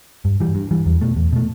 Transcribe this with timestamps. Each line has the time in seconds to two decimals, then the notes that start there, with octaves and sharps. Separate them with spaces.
0.25 G2
0.40 E3 G3
0.55 G2
0.71 E3 G3
0.86 E2
1.01 B2 A3
1.16 E2
1.32 B2 A3